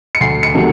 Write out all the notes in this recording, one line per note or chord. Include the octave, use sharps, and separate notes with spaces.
C#7
D2 C7
C#7
C3 D#3 F#3 A3